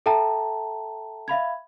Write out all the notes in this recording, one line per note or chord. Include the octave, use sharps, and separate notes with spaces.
A4 E5 G5 A5 A#5
E5 F5 B5 G#6